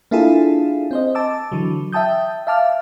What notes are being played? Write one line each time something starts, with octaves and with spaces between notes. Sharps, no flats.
A#3 D4 E4 F4 G#4 A4
C4 C5 D#5
A5 D6 E6
D3 E3 F#3
E5 G5 A5 D#6 G6
E5 F5 A5 D6 F6